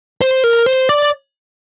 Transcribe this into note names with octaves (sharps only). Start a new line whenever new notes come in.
C5
A#4
C5
D5